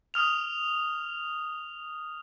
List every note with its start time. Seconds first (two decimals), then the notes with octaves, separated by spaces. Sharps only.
0.14 D#6 F6 F7